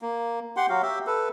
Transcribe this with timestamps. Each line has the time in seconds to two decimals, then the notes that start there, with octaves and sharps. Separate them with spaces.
0.02 A#3
0.57 G4 F#5 C6
0.69 F#3 F#4 F5
0.82 G4 E5
1.07 A4 B4